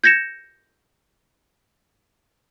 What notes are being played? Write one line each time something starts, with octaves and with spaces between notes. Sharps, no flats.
G6 G#6 A#6 C#7 E7